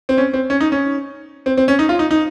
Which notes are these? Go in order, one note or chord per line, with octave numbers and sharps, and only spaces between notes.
C4
C#4
C4
C#4
D#4
C#4
C4
C4
C#4
D#4
F4
D#4
D#4